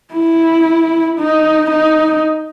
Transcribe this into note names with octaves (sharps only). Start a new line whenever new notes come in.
E4
D#4
D#4